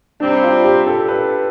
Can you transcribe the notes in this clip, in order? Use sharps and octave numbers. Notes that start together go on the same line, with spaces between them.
C3 G3 C4 D4
F4
G4
A4
B4